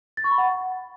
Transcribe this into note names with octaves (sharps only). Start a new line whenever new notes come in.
A6
C#6
B5
F#5